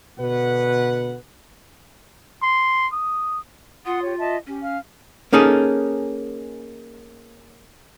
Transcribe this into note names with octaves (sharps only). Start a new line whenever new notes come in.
B2 D3 B4 F#5
C6
D#6
F4 F#5 C6 D#6
G4 C#5
D#5 E5 A5
C#4 G4
F5 F6
A#3 C#4 D#4 G#4 A4